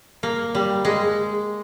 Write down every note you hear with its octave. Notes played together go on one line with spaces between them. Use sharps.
A#3
G3
G#3